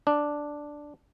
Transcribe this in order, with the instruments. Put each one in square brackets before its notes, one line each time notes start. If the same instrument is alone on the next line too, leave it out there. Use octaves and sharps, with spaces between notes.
[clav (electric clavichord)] D4